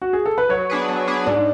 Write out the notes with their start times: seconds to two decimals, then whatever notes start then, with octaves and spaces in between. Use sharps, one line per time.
0.02 F#4
0.13 G#4
0.25 A4
0.38 B4
0.49 F#3 C#5
0.70 B3 D4 G#4 B4
0.89 F#3
1.07 B3 D4 G#4 B4
1.26 G#2 D4